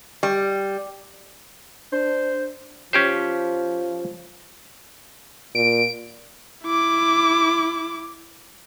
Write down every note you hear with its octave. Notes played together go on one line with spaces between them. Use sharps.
G3
D4 C5
F3 C#4 G4 C5
A#2 D7
E4 D6